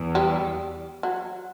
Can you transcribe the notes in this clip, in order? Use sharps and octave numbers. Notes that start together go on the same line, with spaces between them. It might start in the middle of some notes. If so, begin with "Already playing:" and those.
Already playing: E2
G3
F#3